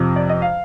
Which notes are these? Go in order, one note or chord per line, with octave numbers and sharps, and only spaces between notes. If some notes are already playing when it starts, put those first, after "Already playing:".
Already playing: F2 C3 F3
D5
D#5
F5